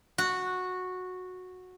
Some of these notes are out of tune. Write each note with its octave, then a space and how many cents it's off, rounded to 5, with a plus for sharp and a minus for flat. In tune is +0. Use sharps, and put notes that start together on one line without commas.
F#4 -10